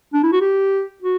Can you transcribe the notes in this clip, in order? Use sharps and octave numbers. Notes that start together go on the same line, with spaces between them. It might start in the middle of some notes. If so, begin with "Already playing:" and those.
D4
E4
F#4
G4
F#4